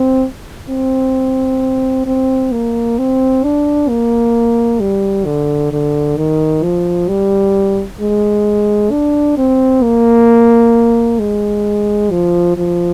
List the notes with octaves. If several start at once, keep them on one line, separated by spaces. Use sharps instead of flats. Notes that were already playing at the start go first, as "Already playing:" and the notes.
Already playing: C4
C4
C4
A#3
C4
D4
A#3
G3
D3
D3
D#3
F3
G3
G#3
D4
C4
A#3
G#3
F3
F3